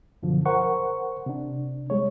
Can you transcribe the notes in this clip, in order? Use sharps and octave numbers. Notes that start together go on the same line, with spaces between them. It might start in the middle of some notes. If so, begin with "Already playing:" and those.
F#2 B2 D3 F3
A#4 C5 F#5 C#6
C3 D4
G3 G#3 C#5